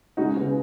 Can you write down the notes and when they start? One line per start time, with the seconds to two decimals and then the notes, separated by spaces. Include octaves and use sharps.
0.17 C#2 D#4 F#4
0.37 C#3 G#3 B3